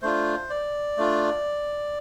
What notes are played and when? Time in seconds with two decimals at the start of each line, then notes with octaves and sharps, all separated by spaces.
0.02 A3 D4 F4 C5
0.50 D5
0.97 A3 D4 F4